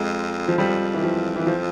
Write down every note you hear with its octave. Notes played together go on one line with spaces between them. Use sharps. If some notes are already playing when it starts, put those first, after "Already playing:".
Already playing: F2 G#3
F3
F2 G3
E3
F3
E3
F3